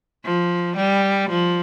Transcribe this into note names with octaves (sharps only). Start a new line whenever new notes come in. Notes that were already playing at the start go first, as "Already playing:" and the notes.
F3
G3
F3